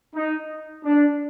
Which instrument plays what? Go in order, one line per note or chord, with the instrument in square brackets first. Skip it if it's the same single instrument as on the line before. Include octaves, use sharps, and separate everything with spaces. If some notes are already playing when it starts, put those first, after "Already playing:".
[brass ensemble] D#4
D4